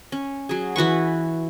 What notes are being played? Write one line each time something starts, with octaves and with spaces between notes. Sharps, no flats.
C#4
F#3 G#4
E3 F#4 B4 C#6